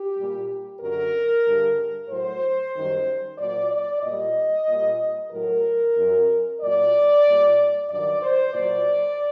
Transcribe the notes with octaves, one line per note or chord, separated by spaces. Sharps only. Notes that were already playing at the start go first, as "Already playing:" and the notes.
Already playing: G4
A#2 G3
F#2 D3 F#3 A#4
G2 D3 G3
A2 F#3 C5
F#2 D#3 G3
A#2 F#3 D5
D5
A#2 G3 D#5
A#2 G3
A2 F#3 A#4
F#2 F#3
A#2 F#3 D5
A#2 G3
G2 D#3 F#3 D5
C5
A#2 F#3 D5